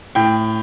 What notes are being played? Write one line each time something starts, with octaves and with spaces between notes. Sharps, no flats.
A2 G5